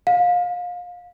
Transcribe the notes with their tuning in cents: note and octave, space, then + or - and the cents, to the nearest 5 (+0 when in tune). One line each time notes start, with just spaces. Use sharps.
F5 +25